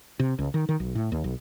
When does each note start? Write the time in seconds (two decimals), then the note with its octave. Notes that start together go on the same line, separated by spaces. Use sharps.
0.19 C3
0.39 C#2
0.54 D#3
0.69 D#3
0.80 B1
0.95 A2
1.12 D#2
1.24 B1